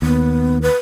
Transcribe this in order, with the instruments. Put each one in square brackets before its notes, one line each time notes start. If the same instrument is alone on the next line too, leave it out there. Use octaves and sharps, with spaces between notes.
[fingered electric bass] D#2 [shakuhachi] B3
[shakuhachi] B4